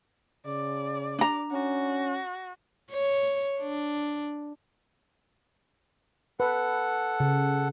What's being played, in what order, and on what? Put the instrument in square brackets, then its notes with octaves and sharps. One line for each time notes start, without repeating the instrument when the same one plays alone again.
[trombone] C#3 [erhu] D5
[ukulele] D4 A#5
[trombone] C#4 [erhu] F#4
[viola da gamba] C#5
D4
[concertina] A4 F#5 [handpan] B4
[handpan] C#3